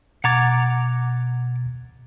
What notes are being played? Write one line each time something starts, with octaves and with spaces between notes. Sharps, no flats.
B2 F#5 A#5 D6 G#6 A6